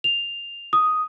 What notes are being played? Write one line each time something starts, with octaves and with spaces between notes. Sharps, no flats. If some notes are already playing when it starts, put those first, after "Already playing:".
F7
D#6